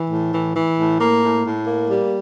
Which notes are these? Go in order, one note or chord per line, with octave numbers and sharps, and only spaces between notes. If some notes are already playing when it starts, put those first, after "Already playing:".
Already playing: E3
A2
E3
E3
A2
A#3
A2
A2
A#3
G3